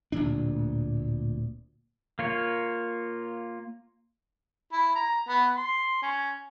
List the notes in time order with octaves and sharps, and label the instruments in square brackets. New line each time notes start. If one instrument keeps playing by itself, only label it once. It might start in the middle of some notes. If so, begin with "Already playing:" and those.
[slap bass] D1 D2 A#2 D4
[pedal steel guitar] A#3 F4 C#5
[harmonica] E4
A#5
B3
C6
C#4